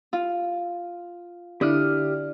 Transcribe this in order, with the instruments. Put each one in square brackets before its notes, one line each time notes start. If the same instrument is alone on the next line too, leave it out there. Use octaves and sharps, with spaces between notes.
[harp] F4
[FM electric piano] D3 E4 [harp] D4 [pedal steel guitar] G4 D#6 F6